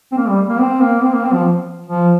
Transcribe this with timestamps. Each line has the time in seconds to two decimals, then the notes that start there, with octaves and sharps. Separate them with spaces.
0.12 C4
0.17 A#3
0.28 G3
0.49 A#3
0.60 C4
0.81 A#3
1.02 C4
1.13 A#3
1.24 C4
1.33 F3
1.87 F3